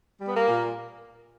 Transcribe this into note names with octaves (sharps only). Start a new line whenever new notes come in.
G3
B3
A#3
A#2